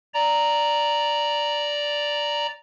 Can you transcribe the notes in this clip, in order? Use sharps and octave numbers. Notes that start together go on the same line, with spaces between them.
D5 A#5